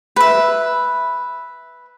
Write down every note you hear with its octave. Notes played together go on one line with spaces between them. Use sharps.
B4 E5